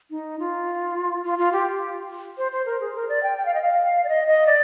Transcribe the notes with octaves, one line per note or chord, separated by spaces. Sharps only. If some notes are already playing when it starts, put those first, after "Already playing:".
D#4
F4
F4
F4
G4
C5
C5
A#4
G#4
A#4
D5
G5
G5
F5
D#5
F5
D5
D#5
D#5
D5